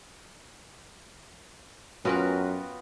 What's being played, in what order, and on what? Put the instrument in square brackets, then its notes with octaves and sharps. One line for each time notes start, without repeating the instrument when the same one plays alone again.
[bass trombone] F#2 [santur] B3 F4 G5 [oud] C#4 [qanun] F#4 A#4 B4